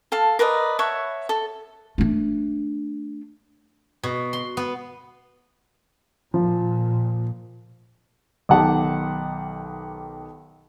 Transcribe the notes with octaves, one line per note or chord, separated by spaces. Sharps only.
A4 F5 A5
A#4 B4 D5 D#5
C#5 E5 F#5 A5
A4
A3 D4
B2
C6
B3
A#2 F3
B1 D#3 G4 F#5 A5